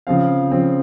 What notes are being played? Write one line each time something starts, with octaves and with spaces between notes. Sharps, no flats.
C#3 F3 C4 F5
C#3 F3 C4